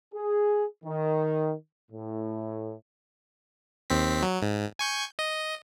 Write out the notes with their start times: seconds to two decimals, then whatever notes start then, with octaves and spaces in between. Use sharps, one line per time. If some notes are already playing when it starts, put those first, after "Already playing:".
0.14 G#4
0.84 D#3
1.91 A2
3.90 D#2 C4 B6
4.23 F#3
4.42 G#2
4.79 G#5 C#6 G6
5.19 D#5